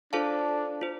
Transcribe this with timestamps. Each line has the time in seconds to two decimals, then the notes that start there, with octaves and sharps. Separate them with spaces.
0.13 D4 F4 A4 C5 F5 A5
0.81 F4 C5